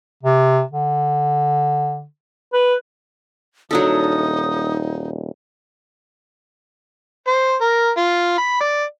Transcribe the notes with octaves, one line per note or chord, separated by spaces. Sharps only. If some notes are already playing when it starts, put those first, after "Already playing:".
C3
D3
B4
D#1 F#3 D4 D#4 A4 D#6
C5
A#4
F4
B5
D5